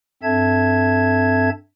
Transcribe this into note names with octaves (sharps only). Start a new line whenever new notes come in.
G2 C4 A4 E5 A5 G#6